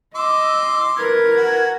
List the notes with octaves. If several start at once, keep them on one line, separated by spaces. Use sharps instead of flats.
D#5 C6 D6 E6
A#4 B4 G#6
F#4